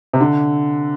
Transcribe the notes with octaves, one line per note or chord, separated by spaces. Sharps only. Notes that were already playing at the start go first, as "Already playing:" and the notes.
C3
D3